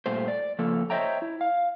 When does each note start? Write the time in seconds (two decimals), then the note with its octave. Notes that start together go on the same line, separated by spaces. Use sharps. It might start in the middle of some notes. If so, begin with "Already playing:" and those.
0.06 G2 A#2 A3 C5
0.28 D5
0.59 C#3 F3 A#3 F4 A4
0.90 C5 C#5 D#5 E5 G5 A#5
1.22 E4
1.41 F5